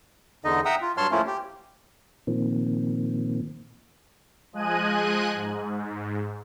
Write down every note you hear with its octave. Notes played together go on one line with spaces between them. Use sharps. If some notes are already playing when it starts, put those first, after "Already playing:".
E2 D3 D#4 D#5
E5 F#5 G5 A#5 D#6 E6
F4
G2 F#3 C#5 A5 C6 F6
F3 A3 A#3 C#4 E4 F4
G4
A#2 D#3 F3 A#3 C4
F3 G#3 D#5 G#5 F#6 D#7
G#2